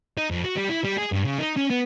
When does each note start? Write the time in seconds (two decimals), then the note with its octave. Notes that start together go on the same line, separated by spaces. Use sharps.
0.17 D#4
0.31 F2
0.44 F#4
0.57 G3
0.69 E4
0.84 G3
0.97 G#4
1.12 G2
1.24 C#3
1.38 D#4
1.56 C#4
1.70 B3